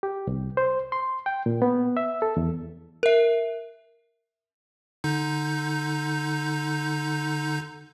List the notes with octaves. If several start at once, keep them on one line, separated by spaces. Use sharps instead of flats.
G4
C2
C5
C6
G5
A#2
B3
E5
A4
E2
A#4 E5
D3 D#4 G6